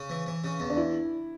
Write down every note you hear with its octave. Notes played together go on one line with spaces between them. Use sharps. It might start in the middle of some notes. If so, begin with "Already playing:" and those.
Already playing: C#3
E3
E3
C#3
E2
D4
E4